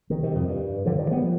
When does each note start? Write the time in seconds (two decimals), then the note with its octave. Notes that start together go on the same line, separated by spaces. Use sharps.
0.10 D#3 G3
0.23 C3 D#3
0.35 F2
0.49 G2
0.85 D3 F3
0.98 D#3 G3
1.11 G3 B3
1.24 F3